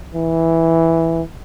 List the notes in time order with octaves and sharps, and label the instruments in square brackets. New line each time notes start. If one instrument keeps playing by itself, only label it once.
[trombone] E3